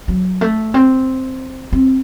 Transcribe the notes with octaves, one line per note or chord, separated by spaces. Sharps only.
F#3
A3
C4
C4